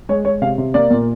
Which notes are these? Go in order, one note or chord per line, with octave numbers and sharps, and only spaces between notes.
G#3 C#5
G#3 C#5
C3 F5
C3
A#3 D5
A#2